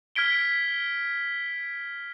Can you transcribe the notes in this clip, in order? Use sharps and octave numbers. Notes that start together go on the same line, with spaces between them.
F6 G#6 B6 D7 G7